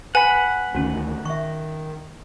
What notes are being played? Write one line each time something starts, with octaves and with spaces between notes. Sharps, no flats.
B4 F#5 G#5 B5
D2 D3 D#3 C#4 F#4
D#3 E5 C#6